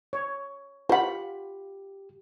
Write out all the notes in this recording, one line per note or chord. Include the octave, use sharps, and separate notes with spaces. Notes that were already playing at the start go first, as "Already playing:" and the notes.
C#5
F4 G4 C5 F#5 B5